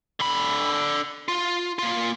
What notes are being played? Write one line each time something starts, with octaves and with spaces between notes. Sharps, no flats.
D3 B5
F4
A#3 F4